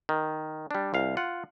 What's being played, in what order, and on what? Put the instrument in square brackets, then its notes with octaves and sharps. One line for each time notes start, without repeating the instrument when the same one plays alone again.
[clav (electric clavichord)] D#3
G3 D4
C2 F5
F4 F#5